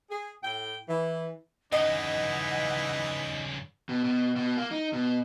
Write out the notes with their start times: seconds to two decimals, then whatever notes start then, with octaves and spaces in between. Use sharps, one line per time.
0.11 G#4
0.43 A2 G5
0.88 E3
1.72 G2 C#3 E3 D#4 D#5 F#5
3.89 B2
4.04 B2
4.36 B2
4.57 A#3
4.71 D#4
4.93 B2